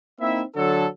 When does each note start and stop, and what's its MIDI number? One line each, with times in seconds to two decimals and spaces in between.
0.20 0.43 58
0.20 0.43 60
0.20 0.43 63
0.20 0.43 64
0.20 0.43 76
0.56 0.87 50
0.56 0.87 54
0.56 0.87 69